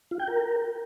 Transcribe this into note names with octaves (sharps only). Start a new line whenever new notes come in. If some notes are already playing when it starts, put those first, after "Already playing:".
F4
G5
A#4